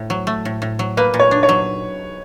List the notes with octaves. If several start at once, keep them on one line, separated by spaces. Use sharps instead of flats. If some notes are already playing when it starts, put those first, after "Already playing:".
Already playing: A2
F#3
A3
A2
A2
F#3
A#3 B4
A#2
C#5
D4
C#5
F#3